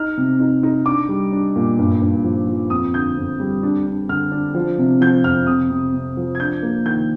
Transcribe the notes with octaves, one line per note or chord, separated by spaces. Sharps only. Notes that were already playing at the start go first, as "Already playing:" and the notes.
Already playing: D#4 F6
C3
D#4
D#4
D4 D6
G3
D4
A#2
G2
G2
F3
F3
F2 D#6
D3 G6
F2
G3
D4
D4
D3 F6
D4
F3
C3
F3 G6
F2 F6
C3 D#6
C3
C3
F3
G#6
D4 G6
A#3
D#3 G6